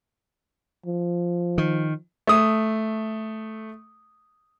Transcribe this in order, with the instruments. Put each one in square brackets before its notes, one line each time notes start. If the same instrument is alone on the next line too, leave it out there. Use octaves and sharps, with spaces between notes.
[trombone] F3
[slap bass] D#3
[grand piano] A3 D#6